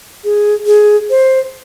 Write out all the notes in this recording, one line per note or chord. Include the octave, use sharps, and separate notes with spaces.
G#4
G#4
C5